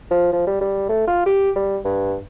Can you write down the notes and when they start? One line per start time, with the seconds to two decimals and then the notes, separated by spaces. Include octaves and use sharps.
0.11 F3
0.33 F3
0.47 G3
0.61 G3
0.89 A3
1.07 F4
1.26 G4
1.56 G3
1.85 G2